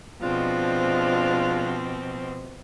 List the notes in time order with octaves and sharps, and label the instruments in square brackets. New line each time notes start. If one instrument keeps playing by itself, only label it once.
[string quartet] B2 F3 C4 [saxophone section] G#3 D4 F4